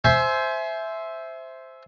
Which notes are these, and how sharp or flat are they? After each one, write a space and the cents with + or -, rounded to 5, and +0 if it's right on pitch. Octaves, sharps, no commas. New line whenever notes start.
C5 +0 E5 +0 G#5 +30